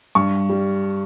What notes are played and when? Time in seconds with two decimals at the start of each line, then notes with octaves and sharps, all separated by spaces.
0.15 G2 C#6
0.50 G3